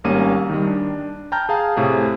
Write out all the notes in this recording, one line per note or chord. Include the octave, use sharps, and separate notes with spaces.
G#1 G3 A#3 C#4 D#7
D#3 G3
D4
G5 A5 A#5 F6 G6
G#4 F5 G#5 A5
A2 C3 G#4